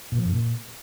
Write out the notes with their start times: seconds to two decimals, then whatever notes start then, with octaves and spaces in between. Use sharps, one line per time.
0.12 A#2
0.19 F3
0.25 F#2
0.32 A#2